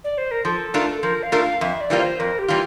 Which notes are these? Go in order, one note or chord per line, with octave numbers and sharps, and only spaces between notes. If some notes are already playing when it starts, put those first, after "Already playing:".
D5
C5
A#4
F3 A4
A3 D4 F4 A#4
F3 A#4
F5
A3 D4 F4 A#4
F5
F2 E5
D5
E3 G3 A#3 F4
C5
F2 A#4
G4
E3 G3 A#3 F4